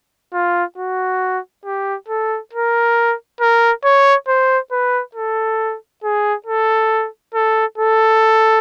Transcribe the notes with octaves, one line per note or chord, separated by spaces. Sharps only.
F4
F#4
G4
A4
A#4
A#4
C#5
C5
B4
A4
G#4
A4
A4
A4